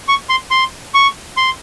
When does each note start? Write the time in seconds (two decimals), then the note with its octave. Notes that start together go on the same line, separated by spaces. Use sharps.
0.08 C#6
0.29 C6
0.51 C6
0.94 C#6
1.37 C6